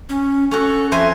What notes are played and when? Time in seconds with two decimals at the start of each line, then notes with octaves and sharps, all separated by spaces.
0.09 C#4
0.51 C#4 F#4 A4
0.92 F2 C5 E5 G#5